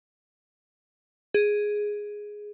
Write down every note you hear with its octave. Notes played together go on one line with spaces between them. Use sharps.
G#4